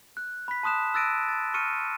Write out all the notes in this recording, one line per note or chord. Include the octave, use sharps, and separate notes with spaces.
F#6
B5 B6
A5 C6 D#6 F#6 E7
E6 F#6 A6 A#6 D7 D#7
A6
C#6 F6 C#7 D#7